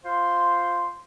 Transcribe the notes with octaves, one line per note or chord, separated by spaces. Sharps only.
F4 C5 C6